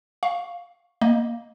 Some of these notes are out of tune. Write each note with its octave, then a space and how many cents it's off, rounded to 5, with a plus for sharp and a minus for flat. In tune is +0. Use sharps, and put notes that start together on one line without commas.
F5 +0 C#6 +0
A#3 +0 D#5 +0